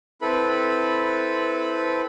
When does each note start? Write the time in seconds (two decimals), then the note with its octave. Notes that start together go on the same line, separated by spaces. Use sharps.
0.22 C4 E4 A4 B4 B5